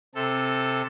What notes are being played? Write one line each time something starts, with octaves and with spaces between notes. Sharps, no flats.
C3 A4